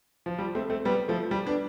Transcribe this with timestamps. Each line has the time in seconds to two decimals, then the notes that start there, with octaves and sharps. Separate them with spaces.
0.26 F3
0.39 G3
0.55 A3 C4
0.70 A3 C4
0.85 G3 B3
1.08 F3 A3
1.31 G3
1.46 B3 D4